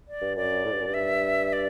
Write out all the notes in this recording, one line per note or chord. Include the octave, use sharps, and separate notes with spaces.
D5
G2
F#2 D5
A2
G2
F#2
G2
E5
D5